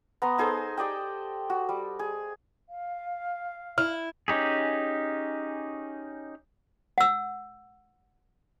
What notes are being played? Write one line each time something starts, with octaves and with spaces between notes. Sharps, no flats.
B3 A#5 C6
D#4 G#4 A4 C5
G4 D5 D#5 G5
F#4
G3
G#4
F5
E4 F6
C#4 D#4 G4 G#4
F#5 E6